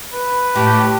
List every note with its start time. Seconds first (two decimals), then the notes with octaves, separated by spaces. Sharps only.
0.13 B4
0.56 A2 G4 A5